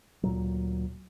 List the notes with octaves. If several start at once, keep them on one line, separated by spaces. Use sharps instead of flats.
D2 A#2 F#3